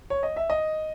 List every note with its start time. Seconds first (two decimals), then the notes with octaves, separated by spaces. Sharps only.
0.10 C#5
0.23 D#5
0.36 E5
0.50 D#5